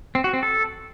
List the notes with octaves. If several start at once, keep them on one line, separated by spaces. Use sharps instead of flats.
C4
F#4
C4
A4